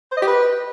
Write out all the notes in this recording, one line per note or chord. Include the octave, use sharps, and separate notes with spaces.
C5
D#5
G4
B4